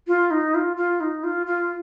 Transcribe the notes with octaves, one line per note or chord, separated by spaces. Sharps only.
F4
D#4
F4
F4
D#4
F4
F4